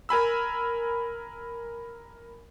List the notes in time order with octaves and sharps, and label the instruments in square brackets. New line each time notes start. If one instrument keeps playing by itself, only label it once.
[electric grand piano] A#4 G#5 B5 E6